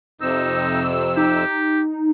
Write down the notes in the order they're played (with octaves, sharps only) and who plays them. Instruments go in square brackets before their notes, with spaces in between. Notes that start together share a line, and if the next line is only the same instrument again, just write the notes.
[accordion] F2 C3 E6 [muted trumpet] D#4
[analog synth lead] D#4 [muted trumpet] G4